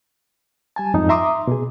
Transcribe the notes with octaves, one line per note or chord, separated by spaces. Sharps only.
G3 G#5 A5
F2 G#2 D#4
E5 A#5 C6 D6 D#6
B2 G#4